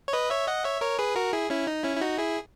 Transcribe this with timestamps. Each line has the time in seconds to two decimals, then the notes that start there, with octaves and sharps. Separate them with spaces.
0.08 C#5
0.13 B4 D#5
0.30 C#5 E5
0.47 D#5 F#5
0.65 C#5 E5
0.81 A#4 C#5
0.99 G#4 B4
1.16 F#4 A#4
1.33 E4 G#4
1.50 C#4 E4
1.67 D#4
1.84 C#4 E4
1.97 E4
2.01 D#4 F#4
2.18 E4 G#4